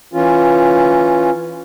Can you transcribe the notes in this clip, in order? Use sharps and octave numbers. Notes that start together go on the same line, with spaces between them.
E3 C#4 F4